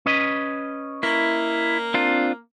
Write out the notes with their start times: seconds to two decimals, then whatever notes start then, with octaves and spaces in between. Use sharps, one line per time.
0.06 C#4 B4 D#5
1.03 A#3 E4
1.94 C4 D4 F4